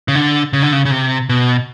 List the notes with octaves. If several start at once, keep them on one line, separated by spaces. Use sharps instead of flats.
C#3
D3
C#3
D3
C#3
C#3
C3
B2